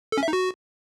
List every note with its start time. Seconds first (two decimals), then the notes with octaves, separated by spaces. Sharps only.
0.12 A4
0.18 C#4
0.23 E5
0.28 D#4
0.33 F#4